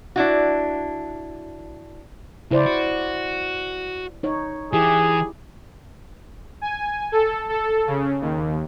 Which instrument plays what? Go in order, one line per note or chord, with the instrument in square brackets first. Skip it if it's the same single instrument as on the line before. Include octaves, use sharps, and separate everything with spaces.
[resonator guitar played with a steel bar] D4 E4 F#4
[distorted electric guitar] C#2 [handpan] E4 C5 D5
[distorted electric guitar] F#4
[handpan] D#4 C#5
[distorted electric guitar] E3 [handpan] E4 G4 [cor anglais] G#4
[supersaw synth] G#5
A4
A4
C#3
D#2